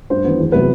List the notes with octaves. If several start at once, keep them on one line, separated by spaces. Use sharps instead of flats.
G2 C5
E3 B3
E2
C3 F#3 B3 B4